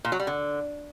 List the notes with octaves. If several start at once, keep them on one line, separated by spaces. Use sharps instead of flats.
A#2
F#3
G3
D3